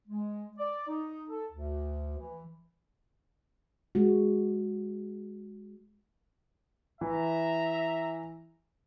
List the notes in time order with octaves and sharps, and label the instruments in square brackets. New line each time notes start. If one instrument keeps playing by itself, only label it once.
[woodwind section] G#3
D5
D#4
A4
D2
E3
[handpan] G#3 F#4
[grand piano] E3 [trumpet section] E5 A#5